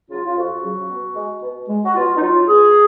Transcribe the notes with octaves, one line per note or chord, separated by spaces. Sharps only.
C#3 F#3 F4
F4
F2 F#4
C#3 F#3
B2
G#3
B2
G#3
F#4
B2 F4
D#4
F#3 F4
B2 G#4